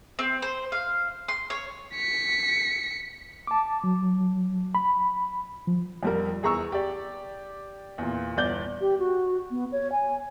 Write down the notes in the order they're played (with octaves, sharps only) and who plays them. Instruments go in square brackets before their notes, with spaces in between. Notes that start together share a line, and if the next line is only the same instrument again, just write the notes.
[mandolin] C4
C5
F5
C6
C#5
[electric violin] B6 C#7
[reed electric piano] A5 D6
F#3
B5
F3
[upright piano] F2 G3 A#4
E2 G#4 A#5 C#6 E6
G4 D5
E2 A#2
G1 E2 D5 G6 G7
[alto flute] G4
F#4
B3
C#5
G#5